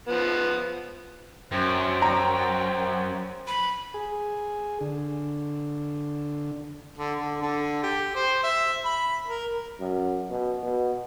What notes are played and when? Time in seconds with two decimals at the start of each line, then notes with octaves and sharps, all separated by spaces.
0.08 F3 B3
1.52 F#2 C5 G5
2.02 A#5
3.47 B5
3.94 G#4
4.81 D3
6.98 D3
7.20 D3
7.42 D3
7.83 G4
8.15 C5
8.43 E5
8.85 B5
9.27 A#4
9.80 F#2
10.30 B2
10.63 B2